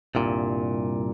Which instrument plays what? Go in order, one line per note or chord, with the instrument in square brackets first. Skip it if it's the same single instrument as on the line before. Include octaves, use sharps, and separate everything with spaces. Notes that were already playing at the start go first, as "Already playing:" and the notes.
[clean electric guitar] C2 G2 A#2